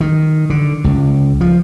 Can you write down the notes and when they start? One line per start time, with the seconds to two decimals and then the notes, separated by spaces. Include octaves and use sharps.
0.01 D#3
0.50 D3
0.84 C#2
1.41 F3